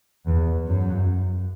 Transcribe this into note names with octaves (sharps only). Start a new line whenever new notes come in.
E2
F#2